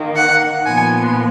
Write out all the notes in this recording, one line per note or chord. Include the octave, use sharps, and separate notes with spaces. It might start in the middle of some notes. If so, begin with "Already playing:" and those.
Already playing: D#3 A#3
F#5
A#2 F3 B3 G#5